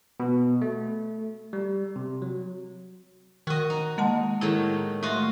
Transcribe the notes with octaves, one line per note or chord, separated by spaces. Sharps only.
B2
A3
G3
C3
F#3
D#3 F#4 D#5
D#4
G#3 A#3 F#5 A5
A2 D#3 F#3 E4 G#4
A3 F4 F#4 D#5